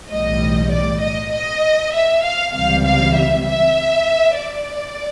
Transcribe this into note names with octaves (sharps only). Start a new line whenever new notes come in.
B1 A2 E3 G3 D#5
D5
D#5
D#5
E5
F5
C#2 C3 E3 G3 F5
F5
E5
E5
D5